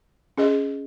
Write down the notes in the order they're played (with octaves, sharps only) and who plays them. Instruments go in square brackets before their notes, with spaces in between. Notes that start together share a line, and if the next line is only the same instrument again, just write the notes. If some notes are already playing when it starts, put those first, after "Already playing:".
[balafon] C#4 G#4 D#5